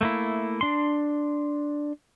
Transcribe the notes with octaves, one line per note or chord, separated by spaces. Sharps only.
A3 A#3 E4
D4 C6